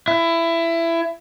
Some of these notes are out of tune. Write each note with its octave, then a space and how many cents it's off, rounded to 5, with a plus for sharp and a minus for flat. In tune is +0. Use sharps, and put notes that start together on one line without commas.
E4 +20